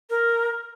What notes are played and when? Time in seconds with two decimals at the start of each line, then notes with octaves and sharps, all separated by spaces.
0.10 A#4